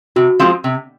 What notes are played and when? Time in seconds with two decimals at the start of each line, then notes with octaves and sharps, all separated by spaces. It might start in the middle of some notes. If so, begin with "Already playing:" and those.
0.16 C3 F#4
0.40 F3 G#3 C4 F4
0.64 C3